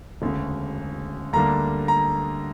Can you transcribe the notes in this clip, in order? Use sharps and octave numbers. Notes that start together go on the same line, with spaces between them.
E1 D2 C#3
D2 D3 G3 A#3 D4 A#5
A#5